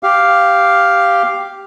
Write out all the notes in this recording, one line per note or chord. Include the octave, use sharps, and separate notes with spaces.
G4 F5